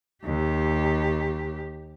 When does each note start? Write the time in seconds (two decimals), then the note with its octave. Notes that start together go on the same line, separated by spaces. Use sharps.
0.24 D#2 G4